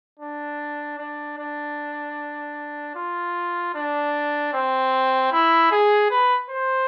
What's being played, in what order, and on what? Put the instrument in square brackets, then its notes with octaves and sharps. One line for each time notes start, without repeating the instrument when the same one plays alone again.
[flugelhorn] D4
D4
D4
F4
D4
C4
E4
G#4
B4
C5